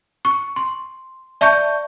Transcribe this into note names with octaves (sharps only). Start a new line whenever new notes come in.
C#6
C6
D5 E5 A5 C#6 G6